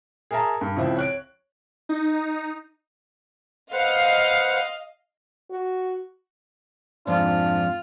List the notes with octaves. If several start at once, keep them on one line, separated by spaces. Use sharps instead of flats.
G#4 A#4 E5 A5 A#5
G2
C#2 F3 C4 E4
C#5 F#6 D7
D#4
B4 C5 D#5 F5 F#5
F#4
F2 G#2 D4 F4